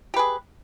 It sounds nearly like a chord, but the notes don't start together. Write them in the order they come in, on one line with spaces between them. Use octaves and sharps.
G4 B4 G#4